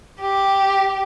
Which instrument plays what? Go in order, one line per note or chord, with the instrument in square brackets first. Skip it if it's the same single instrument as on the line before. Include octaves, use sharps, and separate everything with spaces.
[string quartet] G4